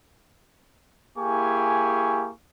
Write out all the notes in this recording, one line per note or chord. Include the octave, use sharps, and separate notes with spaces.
A#3 E4 G4 G#4 G#5 C#6